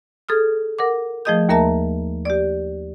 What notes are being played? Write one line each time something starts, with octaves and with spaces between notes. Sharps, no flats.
G#4 A4 D#6 F6
A#4 F#5 D6
F3 A3 G#4 D#5 D#6 G6
D#2 A#3 A#4 E5 A5 A#5
G4 D5